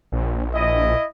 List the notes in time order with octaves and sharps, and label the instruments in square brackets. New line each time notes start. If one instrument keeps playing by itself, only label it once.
[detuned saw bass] A#1
[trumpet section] E4 D#5